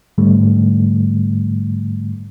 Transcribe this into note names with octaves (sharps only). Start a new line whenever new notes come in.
G#2 D3 G3 A3